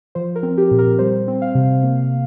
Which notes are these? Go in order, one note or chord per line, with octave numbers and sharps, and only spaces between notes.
F3 C5
A#4
C4
G4
A#2
A#4
G3 C5
C4
F5
C3
A#3